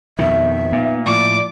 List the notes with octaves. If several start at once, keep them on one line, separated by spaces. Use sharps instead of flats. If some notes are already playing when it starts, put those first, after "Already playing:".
F2 B2 D#3 E5
A#2 A#3 B3 D#4
A2 F3 E4 D5 D6